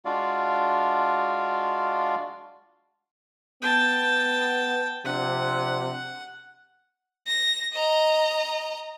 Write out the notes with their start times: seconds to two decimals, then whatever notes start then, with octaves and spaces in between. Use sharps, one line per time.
0.05 G#3 D4 F4 F#4 D5 F5
3.62 B3 G5 A5
5.05 C3 F3 D4 F#5
7.27 A#6
7.74 D#5 A#5